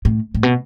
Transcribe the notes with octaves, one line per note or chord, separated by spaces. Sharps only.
A2
A2
B2